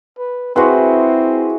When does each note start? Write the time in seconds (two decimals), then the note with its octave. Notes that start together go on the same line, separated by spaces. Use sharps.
0.19 B4
0.56 G#3 C4 E4 F#4 B4 C6